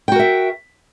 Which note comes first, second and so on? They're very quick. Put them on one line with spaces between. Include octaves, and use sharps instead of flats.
G5 F#4 A#4 E5